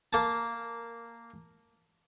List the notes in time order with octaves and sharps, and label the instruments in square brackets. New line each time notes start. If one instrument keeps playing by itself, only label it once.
[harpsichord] A#3 A5